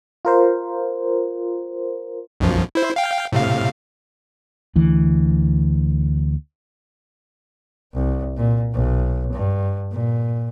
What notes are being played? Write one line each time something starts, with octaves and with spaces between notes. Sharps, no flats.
F4 A#4 C5
B1 F#2 F3
E4 C5
F5 G5
A2 C3 F5
D2 E3
C2
A#2
B1
G2
A#2